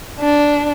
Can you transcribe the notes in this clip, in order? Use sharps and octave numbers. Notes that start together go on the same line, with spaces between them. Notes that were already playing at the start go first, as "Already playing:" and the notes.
D4